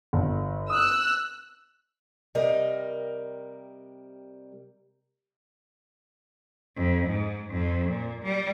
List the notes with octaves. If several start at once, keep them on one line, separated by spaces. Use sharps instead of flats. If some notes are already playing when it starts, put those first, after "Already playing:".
G1
D#6 E6 F#6
C3 G3 A#4 D#5
F2
G#2
F2
A#2
G3